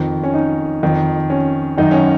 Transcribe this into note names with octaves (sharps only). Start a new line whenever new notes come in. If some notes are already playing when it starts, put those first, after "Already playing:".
Already playing: F2 D#3
C#4
D#4
F2 D#3
C#4
F#2 D#3 D#4
C#4